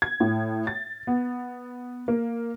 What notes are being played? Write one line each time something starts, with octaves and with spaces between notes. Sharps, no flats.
G#6
A2
A6
B3
A#3